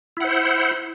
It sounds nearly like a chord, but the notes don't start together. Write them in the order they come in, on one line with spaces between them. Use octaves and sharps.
E4 F#5 C5